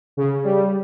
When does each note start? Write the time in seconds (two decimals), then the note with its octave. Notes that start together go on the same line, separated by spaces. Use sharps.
0.17 C#3
0.44 G3